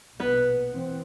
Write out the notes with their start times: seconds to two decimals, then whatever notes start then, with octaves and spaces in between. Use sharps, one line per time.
0.20 A#1 B2 B3 B4
0.73 E3 C4